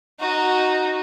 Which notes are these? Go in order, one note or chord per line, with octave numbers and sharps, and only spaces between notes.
D#4 F#4